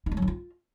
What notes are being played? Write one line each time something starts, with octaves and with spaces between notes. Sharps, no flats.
D#4
A3
F#3
D#3
F4